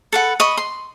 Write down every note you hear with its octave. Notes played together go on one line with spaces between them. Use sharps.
A4 B4 F#5
D#5 B5 C#6
C6